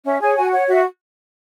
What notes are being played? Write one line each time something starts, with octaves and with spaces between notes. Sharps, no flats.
C#4 E5
G#4 C#5 G#5
F#4 G#5
C#5 F#5
F#4 E5